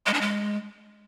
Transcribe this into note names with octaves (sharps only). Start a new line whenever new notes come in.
G#3
D4
G#3